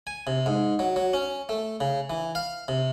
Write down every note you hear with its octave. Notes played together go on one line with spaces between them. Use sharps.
G#5
C3
G#2
F#3
F#3
C#4
A3
C#3
E3
F5
C3